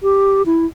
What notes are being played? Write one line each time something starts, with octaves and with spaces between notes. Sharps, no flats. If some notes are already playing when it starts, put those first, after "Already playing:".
G4
E4